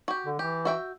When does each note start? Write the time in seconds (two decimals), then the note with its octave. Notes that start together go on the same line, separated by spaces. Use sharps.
0.08 F#4 G4
0.26 D3
0.39 E3 G4
0.65 F#4 E5 G5